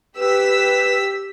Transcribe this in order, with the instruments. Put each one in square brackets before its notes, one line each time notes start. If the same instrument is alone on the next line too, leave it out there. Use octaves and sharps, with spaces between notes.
[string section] G4 E6 B6 [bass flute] B4